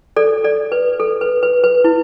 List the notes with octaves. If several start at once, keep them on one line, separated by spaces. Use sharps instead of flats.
A4 D5
A4 D5
B4
A4
B4
B4
B4
E4